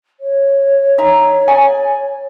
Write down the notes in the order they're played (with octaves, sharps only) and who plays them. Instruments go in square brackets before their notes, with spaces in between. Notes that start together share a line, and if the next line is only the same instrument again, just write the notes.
[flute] C#5
[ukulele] D#4 E5 A#5
G#4 D5 G#5